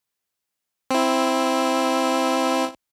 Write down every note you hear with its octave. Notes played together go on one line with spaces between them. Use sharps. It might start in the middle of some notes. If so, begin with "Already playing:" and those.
C4 E4